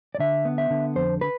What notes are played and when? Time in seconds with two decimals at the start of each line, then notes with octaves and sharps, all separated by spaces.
0.15 D5
0.20 D3 E5
0.45 B3
0.58 E5
0.70 D3
0.96 F2 C5
1.21 B4